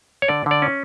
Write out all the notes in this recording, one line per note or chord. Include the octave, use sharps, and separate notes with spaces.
C#5
D3 D5
D3 D5
C#4